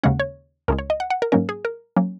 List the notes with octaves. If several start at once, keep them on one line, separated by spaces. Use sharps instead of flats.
D#2 C#3 G#3 C#4 F#5
C#5
C#2 C#3 G#3 A#4
C#5
D#5
F#5
F#5
A#4
G#2 F#3 A#3 C#4 A#4
G#4
A#4
F#3 A#3 C#4